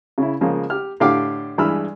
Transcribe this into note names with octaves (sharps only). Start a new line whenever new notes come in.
C#3 E4
C#3 F3 G#3 A#3
G4 F6
A2 D3 G4 F5 G5 D6
G2 E3 G#3 B5 E6 F6